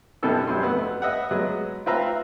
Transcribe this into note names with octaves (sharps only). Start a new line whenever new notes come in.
F#2 B2 E4 G4 A4 E6
F#2 F#3 G3 C6
F2 B3 E6
B4 D#5 E5 F#5
F#3 G#3 B3 D#5
C4 F4 B4 E5 F5 A#5